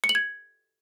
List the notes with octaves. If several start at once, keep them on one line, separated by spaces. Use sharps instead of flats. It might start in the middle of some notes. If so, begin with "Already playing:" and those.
C#7
F#7
G#6